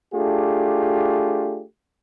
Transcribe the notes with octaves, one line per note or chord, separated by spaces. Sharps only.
A3 D4 F4 G4 G#4